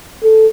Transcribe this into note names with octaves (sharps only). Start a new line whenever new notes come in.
A4